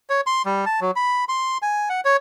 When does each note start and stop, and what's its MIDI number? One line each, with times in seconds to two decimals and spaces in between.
0.10 0.21 73
0.27 0.42 84
0.46 0.65 55
0.66 0.80 81
0.81 0.91 54
0.96 1.25 83
1.29 1.58 84
1.62 1.89 80
1.90 2.01 78
2.05 2.17 73